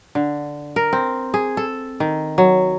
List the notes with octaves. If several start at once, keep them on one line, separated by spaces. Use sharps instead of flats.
D3
A#4
C4
G#4
A4
D#3
F#3